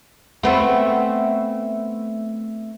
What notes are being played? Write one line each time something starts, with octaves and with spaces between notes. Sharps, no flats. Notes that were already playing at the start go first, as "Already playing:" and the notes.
A3 B3 C4